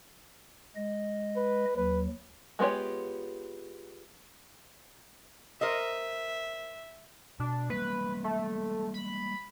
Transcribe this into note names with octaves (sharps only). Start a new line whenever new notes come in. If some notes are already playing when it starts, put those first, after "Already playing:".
G#3 D#5
B4
D#2 F#3 B4
G#3 B3 F4 G4 C#5
A#4 C5 D#5 E5
B2 D4
G3 G#3 A#3 B4
A3
B5